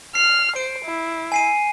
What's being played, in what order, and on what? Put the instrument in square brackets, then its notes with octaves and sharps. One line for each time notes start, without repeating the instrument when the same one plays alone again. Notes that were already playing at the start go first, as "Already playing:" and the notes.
[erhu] F6 [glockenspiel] C7
[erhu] C5 [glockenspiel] D7
[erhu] E4
[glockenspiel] G#5 C7 D#7